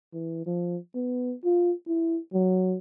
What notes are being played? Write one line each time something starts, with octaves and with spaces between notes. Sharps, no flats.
E3
F3
B3
F4
E4
F#3